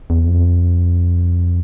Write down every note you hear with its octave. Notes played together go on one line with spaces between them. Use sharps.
E2
F2